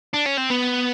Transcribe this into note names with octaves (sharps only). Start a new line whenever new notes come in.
D4
C#4
C4
B3